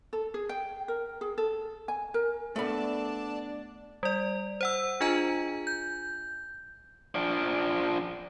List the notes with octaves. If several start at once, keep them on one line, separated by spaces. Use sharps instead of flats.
A4
G#4
G5
A#4
G#4
A4
G#5
A#4
A3 B3 D4 A4 D5 A5 B5
G3 D5
C5 F#5 E6
D4 F4 G#4 D#5 G#5 A#5
G6
F3 D4